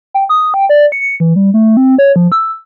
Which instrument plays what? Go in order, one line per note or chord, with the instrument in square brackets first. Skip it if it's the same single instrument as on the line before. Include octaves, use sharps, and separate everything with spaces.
[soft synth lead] G5
D#6
G5
D5
C#7
E3
G3
A3
C4
C#5
F3
E6